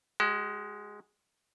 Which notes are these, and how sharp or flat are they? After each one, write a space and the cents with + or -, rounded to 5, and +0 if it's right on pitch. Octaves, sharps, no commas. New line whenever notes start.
G#3 +0 F#4 +45